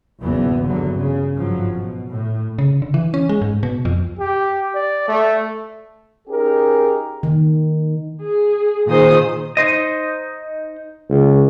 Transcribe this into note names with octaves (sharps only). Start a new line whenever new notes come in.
F#1 E2 G#2 B2 E3 B3
E2 G2 D3 F#3
C#3
G#1 G2 F3 F#3
B2
A2
C#3
D3
E3
C#4
G#3
G#2
B2
F2
G4
D5
A3
C#4 D#4 G4 G#4 A#4
D#3
G#4
A#2 D#3 G#4 C5 D#6
D#4 C5 D#5
C#2